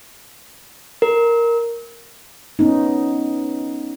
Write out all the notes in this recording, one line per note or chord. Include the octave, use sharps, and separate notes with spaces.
A#4
B3 C#4 D#4